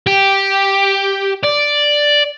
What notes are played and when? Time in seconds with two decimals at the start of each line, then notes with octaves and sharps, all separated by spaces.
0.07 G4
1.43 D5